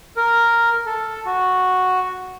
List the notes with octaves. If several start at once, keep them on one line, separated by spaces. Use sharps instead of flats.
A#4
A4
F#4